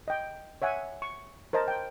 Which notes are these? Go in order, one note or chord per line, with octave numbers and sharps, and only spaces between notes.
D#5 G5
C#5 E5 F#5 G#5
C#6
A#4 C5 D#5 A5
G5